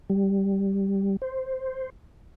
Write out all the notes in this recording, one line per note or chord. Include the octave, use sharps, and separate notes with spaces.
G3
C5